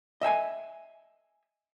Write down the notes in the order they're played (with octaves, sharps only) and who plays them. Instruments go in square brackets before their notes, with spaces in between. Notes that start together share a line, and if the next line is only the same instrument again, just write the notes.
[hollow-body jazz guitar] D#5 E5 G5 G#5